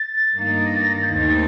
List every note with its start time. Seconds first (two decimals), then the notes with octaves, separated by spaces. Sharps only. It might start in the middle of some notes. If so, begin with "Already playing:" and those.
Already playing: A6
0.36 G2 D#3 A#3 D#4
0.65 A#6
0.75 A6
0.84 A#6
0.93 A6
1.02 G6
1.12 D#2 D#3 A3 C4 D#4 A6